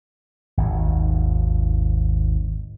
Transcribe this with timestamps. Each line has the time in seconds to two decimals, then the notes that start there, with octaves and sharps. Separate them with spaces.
0.57 G#1 D#2